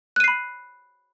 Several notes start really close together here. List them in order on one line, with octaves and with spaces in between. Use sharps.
F#6 D#7 C7 B5